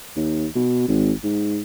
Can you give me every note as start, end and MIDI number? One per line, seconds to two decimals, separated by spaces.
0.16 0.47 39
0.55 0.87 47
0.88 1.12 32
1.24 1.61 44